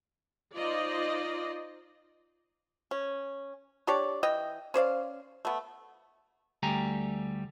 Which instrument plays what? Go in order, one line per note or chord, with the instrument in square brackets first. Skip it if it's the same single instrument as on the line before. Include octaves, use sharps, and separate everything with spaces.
[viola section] D#4 F4 C5 D5 D#5
[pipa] C#4
D4 G4 C#5 D5
E3 D#5 G5
C#4 C5 D5 F5
A3 B3
[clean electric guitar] D2 G3 A3 G4 G#5 A#5